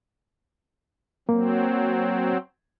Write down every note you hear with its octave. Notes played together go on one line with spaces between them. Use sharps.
F#3 A#3 C4